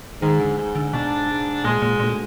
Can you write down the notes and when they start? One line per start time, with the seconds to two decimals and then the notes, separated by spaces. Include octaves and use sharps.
0.22 G#2 D#3
0.40 D3
0.57 G#2
0.75 D3
0.93 B2 D4
1.29 G#2
1.64 A#2 G#3
1.82 A#2
2.00 D2 A#2